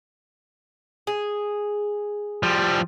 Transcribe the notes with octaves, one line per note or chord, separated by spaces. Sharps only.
G#4
F3 G3